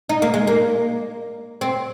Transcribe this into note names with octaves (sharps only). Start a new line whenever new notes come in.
D#4
A#3
G#3
A#3
C4